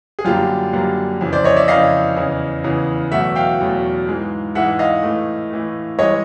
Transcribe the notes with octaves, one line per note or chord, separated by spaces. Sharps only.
G#4
F#2 D3 G3 A#3 F4 G4
F#2 D3 G3 A#3
F2 C#3 E3
C5 D5
C#5 D#5
D5 E5
F2 C#3 E3 D#5 F5
E2 C#3 E3
E2 C#3 E3
E2 B2 F#3 A3 E5 F#5
F5 G5
E2 B2 F#3 A3
G#2 E3 G#3
G#2 E3 G#3 E5 F#5
D#5 F5
A2 E3 A3
A2 E3 A3
G2 E3 G#3 C#5 D#5